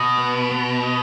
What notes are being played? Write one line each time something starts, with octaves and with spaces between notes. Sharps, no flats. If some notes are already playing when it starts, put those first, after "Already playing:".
Already playing: B2 D#5
B3
B3
D#5